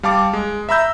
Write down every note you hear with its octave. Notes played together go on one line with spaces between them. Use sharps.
G3 F5 A5 D6
G#3
E5 A#5 B5 E6 G6